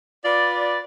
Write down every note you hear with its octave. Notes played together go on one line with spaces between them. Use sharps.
F4 B4 D5